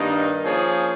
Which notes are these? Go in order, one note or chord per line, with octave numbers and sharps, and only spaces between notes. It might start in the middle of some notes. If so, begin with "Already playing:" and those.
Already playing: G2 D#3 A#3 D#4
F3 A#3 C#4 G#4